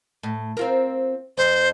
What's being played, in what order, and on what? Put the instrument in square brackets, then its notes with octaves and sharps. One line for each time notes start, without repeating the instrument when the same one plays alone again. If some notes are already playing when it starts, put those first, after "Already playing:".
[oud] A2
C4 F4 A#4
[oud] F2 [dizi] C5